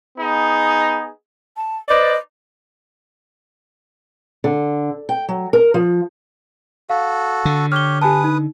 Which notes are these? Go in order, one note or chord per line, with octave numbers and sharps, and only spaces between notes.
B3 D#4 G#4
A5
B4 C5 D5 D#5
D3
G5
F#3
A#4
F3
F#4 A4 F5
D3
G4 C#5 F6 G7
G4 B4 G#5 A5 D#6
D#4